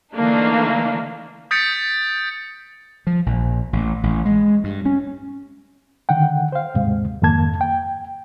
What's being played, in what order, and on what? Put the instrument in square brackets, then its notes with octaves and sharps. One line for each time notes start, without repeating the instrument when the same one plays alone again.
[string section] D3 E3 A3 A#3 D4 D#4
[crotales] D#6 G6 A6 B6 C#7 D7
[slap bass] F3
A#1
A1
A1
G#3
G2
C#4
[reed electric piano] D3 D#3 F#5 G5
C5 F5
D#2 G#2 C3 G#3
F2 G#2 D#3 A#3 A5 G#6
G5